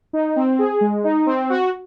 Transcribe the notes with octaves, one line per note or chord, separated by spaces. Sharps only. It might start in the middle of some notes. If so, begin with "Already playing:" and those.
D#4
C4
G#4
G#3
D#4
C4
F#4